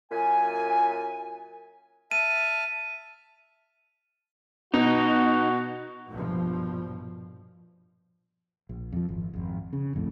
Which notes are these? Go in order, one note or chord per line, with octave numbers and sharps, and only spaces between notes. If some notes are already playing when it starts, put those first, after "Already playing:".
F#2 A#2 G#5
E5 A5 F6 D#7
B2 D#4 F#4
A#1 G2 B2 F3
A#1
F2 F3
G#1
G#1 F2
C#3
G1 C2 F2 A2